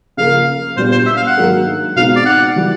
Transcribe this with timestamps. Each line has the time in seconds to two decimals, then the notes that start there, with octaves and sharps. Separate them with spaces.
0.17 C#3 F3 A#3 F5
0.77 A#2 G3 B3 D4 G4 C5
0.92 C5
1.06 E5
1.17 F5
1.26 F#5
1.37 G#2 D#3 F#3 A#3 D4
1.96 B2 G#3 C4 D#4 F5
2.16 D5
2.25 F#5
2.56 E3 G3